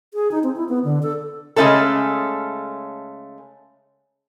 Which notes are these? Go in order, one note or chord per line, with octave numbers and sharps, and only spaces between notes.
G#4
D#4
C4
E4
B3
D3
A4
C#3 G#3 A3 C#4 A4